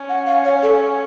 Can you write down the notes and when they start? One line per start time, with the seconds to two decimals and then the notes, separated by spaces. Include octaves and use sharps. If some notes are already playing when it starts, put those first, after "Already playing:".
Already playing: C#4
0.09 F#5
0.26 F5
0.44 C#5
0.62 A4